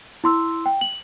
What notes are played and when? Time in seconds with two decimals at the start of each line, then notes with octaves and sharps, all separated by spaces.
0.24 E4 C6 E6
0.66 G5
0.81 F#7